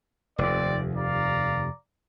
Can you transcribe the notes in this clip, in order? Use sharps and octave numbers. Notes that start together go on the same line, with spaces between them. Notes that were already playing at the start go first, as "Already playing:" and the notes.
F1 D#2 C4 D5
D5 F5 A#5